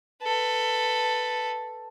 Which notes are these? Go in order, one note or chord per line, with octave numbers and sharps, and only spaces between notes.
A4 B4